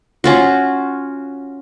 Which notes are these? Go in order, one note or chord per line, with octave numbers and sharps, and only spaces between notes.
C#4 F4 F#4